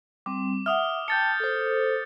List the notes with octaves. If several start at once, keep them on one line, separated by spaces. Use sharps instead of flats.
G3 C4 D6
E5 F#5 D#6 F6
G5 A5 G6 A6 C#7
A4 C5